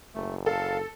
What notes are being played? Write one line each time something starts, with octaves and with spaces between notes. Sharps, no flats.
F#1 A3
A4 F5 A5